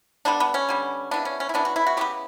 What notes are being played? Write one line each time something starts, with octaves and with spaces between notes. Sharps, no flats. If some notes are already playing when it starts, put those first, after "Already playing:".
D3 G3 B3 D4
B3
C#4
D3 G3 B3
C#3 E3 B3 D4
C#4
C#4
E4
C#3 E3 B3 D4
F#4
E4
F#4
C#3 E3 B3 G4